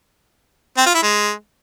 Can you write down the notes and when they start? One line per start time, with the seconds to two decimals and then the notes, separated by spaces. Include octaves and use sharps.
0.78 C4
0.86 F4
0.94 E4
1.03 G#3